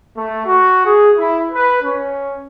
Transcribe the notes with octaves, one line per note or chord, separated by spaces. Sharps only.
A3
F#4
G#4
E4
B4
C#4